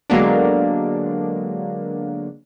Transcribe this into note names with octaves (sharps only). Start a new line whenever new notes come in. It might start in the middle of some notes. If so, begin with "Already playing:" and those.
D3 F#3 G#3 A#3 B3 D4